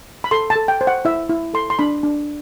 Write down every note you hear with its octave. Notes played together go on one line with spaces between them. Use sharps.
B5
A4 C6
A5
A4
G5
C5
F#5
E4 E5
E4
A4 C6
C6
D4 B5
D4